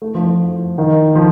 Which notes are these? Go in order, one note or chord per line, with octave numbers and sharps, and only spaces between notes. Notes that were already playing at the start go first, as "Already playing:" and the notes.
A3
F3
D#3
F3